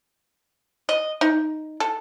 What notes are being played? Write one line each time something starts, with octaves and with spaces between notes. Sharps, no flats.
D#5
D#4
A4